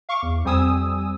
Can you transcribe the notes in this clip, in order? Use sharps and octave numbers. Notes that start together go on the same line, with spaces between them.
F5 C#6 D6
E2
F2 G3 C4 G#5 D#6 E6